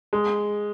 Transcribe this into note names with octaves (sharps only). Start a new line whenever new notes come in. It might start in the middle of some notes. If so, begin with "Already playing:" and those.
G#3